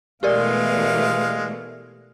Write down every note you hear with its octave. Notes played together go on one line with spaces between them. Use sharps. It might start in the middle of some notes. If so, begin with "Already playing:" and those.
B2 E3 G#3 A3 G4 A#4 D5 F5